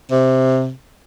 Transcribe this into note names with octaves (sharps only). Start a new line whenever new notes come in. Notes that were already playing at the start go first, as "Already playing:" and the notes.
C3